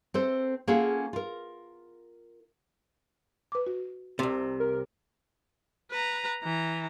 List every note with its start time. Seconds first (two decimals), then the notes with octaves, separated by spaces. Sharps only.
0.14 C4 A4 C5
0.68 A#3 C#4 F4 G#4 A4 F#5
1.13 F4 A#4
3.52 B4 D6
3.67 F#4
4.19 C2 C3
4.60 A#4
5.91 B4 A#5
6.43 E3 A#5